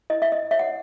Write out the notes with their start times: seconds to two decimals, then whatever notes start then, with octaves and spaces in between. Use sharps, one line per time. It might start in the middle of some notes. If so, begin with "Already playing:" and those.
0.10 E4 D#5
0.22 E5
0.32 D#5
0.51 C#5 E5
0.59 F#5